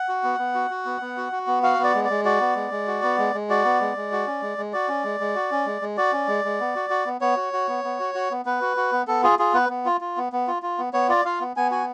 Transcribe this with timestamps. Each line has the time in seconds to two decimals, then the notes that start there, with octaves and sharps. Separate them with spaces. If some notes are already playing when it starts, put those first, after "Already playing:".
Already playing: F#5
0.09 F#4
0.24 B3
0.39 B3
0.55 F#4
0.71 F#4
0.86 B3
1.01 B3
1.17 F#4
1.32 F#4
1.47 B3
1.63 F#4 F5
1.79 B3 D5
1.95 G#3
2.04 D5
2.10 G#3
2.25 F#4 D5
2.41 B3
2.56 G#3
2.72 G#3
2.87 F#4
3.03 B3
3.18 G#3
3.34 G#3
3.50 F#4 D5
3.65 B3
3.81 G#3
3.97 G#3
4.12 F#4
4.27 C#4
4.42 G#3
4.58 G#3
4.73 F#4 D5
4.89 C#4
5.04 G#3
5.20 G#3
5.35 F#4
5.51 C#4
5.66 G#3
5.82 G#3
5.97 F#4 D5
6.13 C#4
6.28 G#3
6.45 G#3
6.60 B3
6.76 F#4
6.90 F#4
7.06 B3
7.21 B3 C#5
7.37 F#4
7.53 F#4
7.68 B3
7.84 B3
8.00 F#4
8.15 F#4
8.31 B3
8.45 B3 B4
8.61 F#4
8.77 F#4
8.92 B3
9.08 B3 A4
9.23 F4 G#4
9.39 F4 G#4
9.54 B3 B4
9.69 B3
9.86 F4
10.01 F4
10.17 B3
10.33 B3
10.48 F4
10.63 F4
10.79 B3
10.93 B3 C#5
11.09 F4 D5
11.25 F4 F5
11.40 B3
11.57 B3 G#5
11.71 F#4 G#5